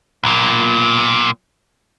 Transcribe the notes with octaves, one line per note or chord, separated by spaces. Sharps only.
B1 A#2